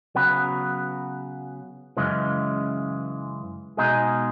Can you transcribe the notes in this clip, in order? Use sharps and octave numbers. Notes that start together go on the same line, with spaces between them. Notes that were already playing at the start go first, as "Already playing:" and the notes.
C#3 F#3 B3 F#4 B4
F#2 C#3 E3 G#3
B2 G#3 D#4 G#4